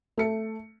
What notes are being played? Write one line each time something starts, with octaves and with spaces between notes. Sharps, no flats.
A3 C#7